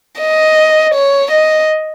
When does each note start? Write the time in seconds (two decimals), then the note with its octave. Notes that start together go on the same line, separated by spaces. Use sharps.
0.21 D#5
0.94 C#5
1.31 D#5